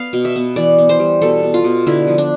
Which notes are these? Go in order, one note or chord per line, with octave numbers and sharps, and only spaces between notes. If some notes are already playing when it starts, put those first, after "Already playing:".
Already playing: B3 F5
B2
E5
B3
E3 D5
B3
C5
G3
B2 A4
B2
F4
B2
D3 E4
F3
D4